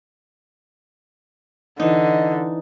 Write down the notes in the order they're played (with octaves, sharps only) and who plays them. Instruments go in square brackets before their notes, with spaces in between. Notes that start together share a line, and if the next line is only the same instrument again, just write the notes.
[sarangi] D3 [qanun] E3 D#4 [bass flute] D#5